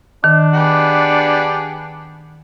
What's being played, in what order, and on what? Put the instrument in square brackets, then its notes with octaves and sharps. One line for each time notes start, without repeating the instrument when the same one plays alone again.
[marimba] D#3 [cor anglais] D4
[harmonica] B3 G4 G#4